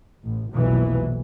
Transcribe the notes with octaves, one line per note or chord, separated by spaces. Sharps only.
A1
F1 B1 A#2 E3